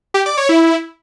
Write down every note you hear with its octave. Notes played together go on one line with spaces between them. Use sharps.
G4
D5
C#5
E4